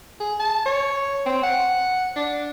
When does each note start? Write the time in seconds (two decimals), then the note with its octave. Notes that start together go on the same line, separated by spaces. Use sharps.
0.20 G#4
0.40 A5
0.66 C#5
1.26 C4
1.44 F#5
2.16 D4